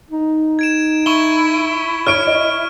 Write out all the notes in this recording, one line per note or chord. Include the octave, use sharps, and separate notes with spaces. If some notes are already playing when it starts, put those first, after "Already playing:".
D#4
G#6 D7 E7
E4 C#6 G7
C#5 C#6 F6 D7
D#5